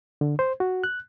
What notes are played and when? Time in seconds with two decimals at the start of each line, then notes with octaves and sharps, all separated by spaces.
0.21 D3
0.39 C5
0.60 F#4
0.84 F#6